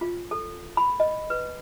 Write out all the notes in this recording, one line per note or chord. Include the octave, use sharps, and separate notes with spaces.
F4
A4
B5
D#5
B4